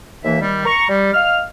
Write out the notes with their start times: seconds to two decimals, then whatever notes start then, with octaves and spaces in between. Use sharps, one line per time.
0.24 D#2 E3 A#3 D#4 E5
0.40 D#3 G3
0.65 A#5 C#6
0.89 G3
1.13 D#5 F5 F6